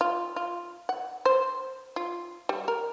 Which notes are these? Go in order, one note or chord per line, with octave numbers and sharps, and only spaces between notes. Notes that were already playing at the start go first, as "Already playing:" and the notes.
F4
F4
F#5
C5
F4
G3
A#4